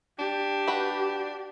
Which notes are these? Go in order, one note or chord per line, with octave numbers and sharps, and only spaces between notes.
D4 G4
F#4 B4